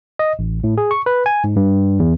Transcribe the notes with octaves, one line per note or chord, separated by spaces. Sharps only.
D#5
A1
A2
G#4
C#6
B4
G#5
G#2
G2
E2